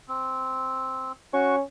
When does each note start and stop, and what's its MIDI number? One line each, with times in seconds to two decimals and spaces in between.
0.08 1.12 60
1.33 1.61 61
1.33 1.56 66
1.33 1.56 85